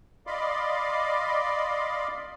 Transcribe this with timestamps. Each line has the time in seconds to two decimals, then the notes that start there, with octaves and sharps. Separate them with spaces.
0.27 D5 D#5 F5 B5 C6 D6